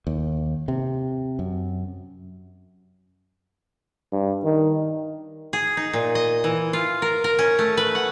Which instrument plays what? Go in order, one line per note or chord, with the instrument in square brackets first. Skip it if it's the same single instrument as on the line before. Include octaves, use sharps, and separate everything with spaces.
[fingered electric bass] D#2
C3
F#2
[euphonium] G2
D#3
[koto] G#4
D#4
A#2
D#5
E3
F4
A#4
A#4
C#4
A3
B4
F#5